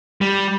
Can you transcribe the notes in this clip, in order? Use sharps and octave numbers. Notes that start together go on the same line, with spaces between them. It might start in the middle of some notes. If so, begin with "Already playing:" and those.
G3